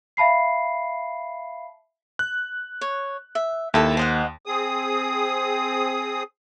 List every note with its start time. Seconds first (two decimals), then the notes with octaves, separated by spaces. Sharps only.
0.17 E5 F5 A5 B5 C7
2.19 F#6
2.81 C#5
3.35 E5
3.74 D#2 E4 A4 A5
3.97 C5 D#5 F#5
4.46 C4 G#4 D#6